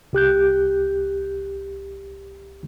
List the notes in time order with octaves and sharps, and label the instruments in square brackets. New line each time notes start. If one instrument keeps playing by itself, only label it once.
[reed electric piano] C2 G4 F#6 G6